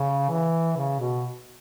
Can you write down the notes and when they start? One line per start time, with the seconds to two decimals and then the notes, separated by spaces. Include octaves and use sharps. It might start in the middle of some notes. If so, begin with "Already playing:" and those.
Already playing: C#3
0.29 E3
0.77 C#3
1.00 B2